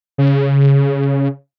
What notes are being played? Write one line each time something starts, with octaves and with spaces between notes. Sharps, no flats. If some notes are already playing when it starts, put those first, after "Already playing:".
C#3